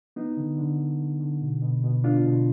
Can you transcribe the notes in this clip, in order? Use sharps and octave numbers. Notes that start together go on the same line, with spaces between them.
B3 D#4
D3
D3
D3
D3
D3
B2
B2
B2
B3 D4 F4
B2